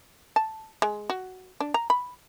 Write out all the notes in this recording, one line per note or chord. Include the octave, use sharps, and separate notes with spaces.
A5
G#3
F#4
D4
A#5
B5